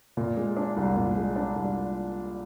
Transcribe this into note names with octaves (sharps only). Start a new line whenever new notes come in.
A#2
G#3
D4
C2
A#2
G#3
D4
C2